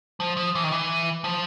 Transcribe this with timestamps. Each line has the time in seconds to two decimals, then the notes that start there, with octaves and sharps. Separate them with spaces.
0.20 F3
0.37 F3
0.55 E3
0.64 D#3
0.72 E3
1.24 F3